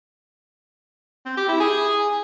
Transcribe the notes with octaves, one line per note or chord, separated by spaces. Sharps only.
C4
G4
E4
G#4